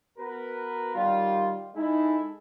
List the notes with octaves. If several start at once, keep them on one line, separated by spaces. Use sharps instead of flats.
B3 F#4 A#4 B4
D#3 G3 F4
G#3 D#4 E4 A4